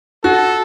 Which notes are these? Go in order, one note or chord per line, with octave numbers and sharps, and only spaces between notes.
F#4 A4